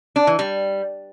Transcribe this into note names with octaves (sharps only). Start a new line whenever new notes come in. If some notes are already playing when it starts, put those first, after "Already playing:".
D4
E3
G3